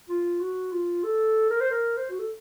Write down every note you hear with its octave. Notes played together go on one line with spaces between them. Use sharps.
F4
F#4
F4
A4
A#4
C5
A#4
C5
F#4
A4